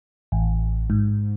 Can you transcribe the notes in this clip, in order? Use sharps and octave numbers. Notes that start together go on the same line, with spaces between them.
A1
G#2